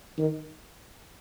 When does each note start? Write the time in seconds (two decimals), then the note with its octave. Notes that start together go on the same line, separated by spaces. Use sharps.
0.18 D#3